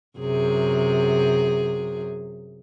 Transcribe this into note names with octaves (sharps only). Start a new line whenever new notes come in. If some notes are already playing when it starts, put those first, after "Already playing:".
F#2 C3 G#4